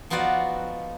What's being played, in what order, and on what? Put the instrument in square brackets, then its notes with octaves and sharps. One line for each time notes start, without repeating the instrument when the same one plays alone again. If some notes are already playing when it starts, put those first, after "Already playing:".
[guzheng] F3 B3 D#4 F4 F#4 D5